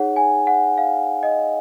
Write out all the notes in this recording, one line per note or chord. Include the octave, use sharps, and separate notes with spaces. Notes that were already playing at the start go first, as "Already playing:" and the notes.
Already playing: D#4 G#4 C#5 F#5
G#5
F#5
F5
D#5